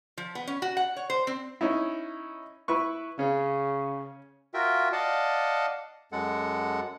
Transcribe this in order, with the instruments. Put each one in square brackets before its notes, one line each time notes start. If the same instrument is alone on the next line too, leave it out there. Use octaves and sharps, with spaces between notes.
[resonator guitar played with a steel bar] F3
B3
C#4
F#4
F#5
C#5
C5
C4
[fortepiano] C#4 D#4 E4
E4 B4 C#6
[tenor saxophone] C#3 [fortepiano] C#4
[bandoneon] F4 F#4 A#4 E5 G5
D5 D#5 F5 F#5 A5
F#2 G#3 A4 F#5